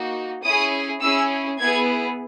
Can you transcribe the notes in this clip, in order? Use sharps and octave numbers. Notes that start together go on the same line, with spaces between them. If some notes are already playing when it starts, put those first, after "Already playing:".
Already playing: A#3 D#4 F#4
C#4 E4 G#4 D#6
C#4 E4 G#4 E6
B3 E4 G#4 G#6